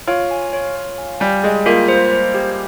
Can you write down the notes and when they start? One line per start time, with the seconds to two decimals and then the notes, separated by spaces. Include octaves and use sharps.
0.07 F4 C#5
0.31 G#5
0.53 C#5
0.76 C#5
0.98 G#5
1.20 G3 G#5
1.44 G#3 G#4
1.66 A#3 F4
1.88 C5
2.12 C5
2.34 G4